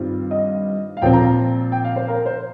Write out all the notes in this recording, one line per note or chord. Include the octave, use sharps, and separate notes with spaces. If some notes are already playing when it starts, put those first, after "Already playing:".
Already playing: G2 D#3 G3 C4 F4
D#5
F5
A#2 F3 C4 G5
A#5
G5
F5
C5
A#4
C5